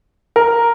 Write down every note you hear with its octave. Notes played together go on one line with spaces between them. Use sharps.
A#4